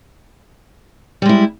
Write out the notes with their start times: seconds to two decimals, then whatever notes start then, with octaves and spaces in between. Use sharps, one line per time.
1.22 G3
1.26 G#3
1.29 E4